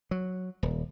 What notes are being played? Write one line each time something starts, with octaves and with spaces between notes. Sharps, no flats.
F#3
D#1